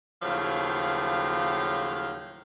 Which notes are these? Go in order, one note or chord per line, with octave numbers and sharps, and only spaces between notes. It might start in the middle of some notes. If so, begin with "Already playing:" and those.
D#2 A2 C#3 F3 F#3 F5